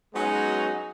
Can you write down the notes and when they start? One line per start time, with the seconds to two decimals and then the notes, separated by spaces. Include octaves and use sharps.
0.15 F#3 G#3 B3 C#4 D#4 F#4